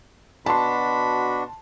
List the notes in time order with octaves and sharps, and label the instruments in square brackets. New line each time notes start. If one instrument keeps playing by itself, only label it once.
[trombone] B2 [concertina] D4 F#4 [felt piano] A5 C6 [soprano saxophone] B5